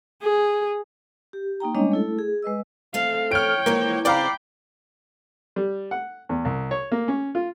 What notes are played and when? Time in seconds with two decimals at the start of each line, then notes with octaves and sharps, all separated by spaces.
0.22 G#4
1.33 G4
1.60 A#3 D#4 G5 A#5
1.75 G3 G#3 C#4 D4 C#5 D#5
1.92 A3 E4 A4
2.19 G#4
2.43 G#3 B4 D#5 E6
2.94 A3 C4 F5
3.32 C#5 G5 F6 D7
3.66 E3 F3 G#3 A#3
4.05 C#3 C4 D4 D5 F5 G5 A#5 B5
5.56 G3
5.91 F#5
6.29 E2
6.45 C2
6.71 C#5
6.92 A#3
7.08 C#4
7.35 F4